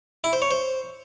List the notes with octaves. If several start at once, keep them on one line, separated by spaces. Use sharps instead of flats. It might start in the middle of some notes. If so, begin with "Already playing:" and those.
E4
C5
C#5
C5